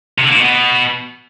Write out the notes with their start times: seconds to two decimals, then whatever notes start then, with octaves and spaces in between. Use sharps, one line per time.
0.18 C3
0.24 D3
0.30 A#3
0.35 A#2
0.41 B2